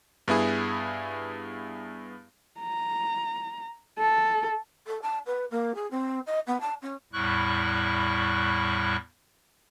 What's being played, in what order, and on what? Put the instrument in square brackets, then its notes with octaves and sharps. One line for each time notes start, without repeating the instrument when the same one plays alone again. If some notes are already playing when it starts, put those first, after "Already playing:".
[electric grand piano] G2 B3 E4 G#4
[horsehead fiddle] A#5
A4
[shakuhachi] A4
A5
B4
A#3
G#4
C4
D#5
B3
A5
C#4
[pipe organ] E2 A2 G3 E4 C#6 F#6